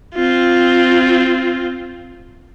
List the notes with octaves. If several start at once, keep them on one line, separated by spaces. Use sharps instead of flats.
C4 F4